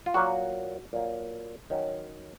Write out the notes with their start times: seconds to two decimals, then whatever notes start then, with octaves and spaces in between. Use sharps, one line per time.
0.06 F4
0.14 A#2 F#3 A#3 F#4
0.93 A#2 F#3 A#3
1.70 D#3 F#3 C#4